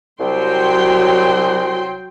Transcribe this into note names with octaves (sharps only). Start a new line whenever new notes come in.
C2 F#3 G5 C6